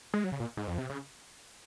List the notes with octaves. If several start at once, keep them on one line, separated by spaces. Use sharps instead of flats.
G#3
F#3
C#3
A#2
G#2
F2
C3
C#3